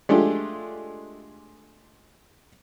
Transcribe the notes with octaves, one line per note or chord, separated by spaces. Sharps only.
G#3 A3 D4 F4 G4